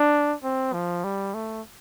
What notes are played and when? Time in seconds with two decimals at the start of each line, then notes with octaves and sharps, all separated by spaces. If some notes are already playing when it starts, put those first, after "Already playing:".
Already playing: D4
0.44 C4
0.73 F3
1.04 G3
1.34 A3